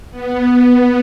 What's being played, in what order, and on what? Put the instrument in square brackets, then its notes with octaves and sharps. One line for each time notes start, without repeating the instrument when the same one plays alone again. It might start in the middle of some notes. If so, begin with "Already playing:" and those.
[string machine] B3